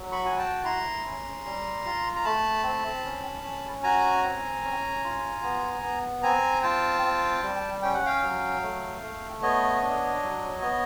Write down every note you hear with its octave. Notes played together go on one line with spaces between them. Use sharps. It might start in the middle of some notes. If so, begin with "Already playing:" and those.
Already playing: F#3
B5 C#6
F#4 G#5
G5 A5
E4 A#5 C6
C#4
G3
F4
A#5
A3 A5 B5
C4
C#4
C#4
F#4 G#5 A#5
C4
C#4
F4
B3
B3
C4 G#5 A#5
F4 G5 A5
C4
G3
C#4 G5
F#5
F5 G5
F#3
A3
A3
B3 C#5 D#5
D4
F#3
B3